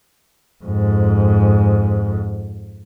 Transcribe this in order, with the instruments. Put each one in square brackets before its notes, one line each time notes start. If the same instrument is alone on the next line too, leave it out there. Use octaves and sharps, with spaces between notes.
[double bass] F2 G#2